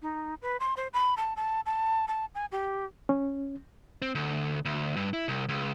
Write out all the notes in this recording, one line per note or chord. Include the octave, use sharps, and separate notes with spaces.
D#4
B4
C6
C5
B5
A5
A5
A5
A5
G#5
G4
C#4
C4
D2
D2
G2
E4
C2
C#2